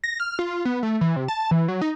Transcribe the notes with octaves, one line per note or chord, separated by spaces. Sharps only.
A#6
F6
F4
B3
A3
E3
C3
A5
E3
F#3
D#4